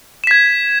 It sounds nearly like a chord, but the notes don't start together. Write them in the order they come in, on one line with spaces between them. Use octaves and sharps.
E7 B6 G#6